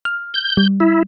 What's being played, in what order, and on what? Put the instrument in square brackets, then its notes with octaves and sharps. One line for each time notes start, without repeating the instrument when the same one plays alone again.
[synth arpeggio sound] F6
[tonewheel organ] G6
[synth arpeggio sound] G3
[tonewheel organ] E4